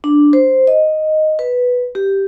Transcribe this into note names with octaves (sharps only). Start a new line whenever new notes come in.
D4
C5
D#5
B4
G4